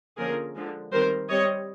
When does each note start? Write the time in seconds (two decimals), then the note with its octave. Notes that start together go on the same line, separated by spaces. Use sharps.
0.18 D3 F3 A#3 C#4 G#4 A#4
0.55 D3 F3 G#3
0.92 D#3 G3 C4 A#4 C5
1.29 G3 C4 C#5 D#5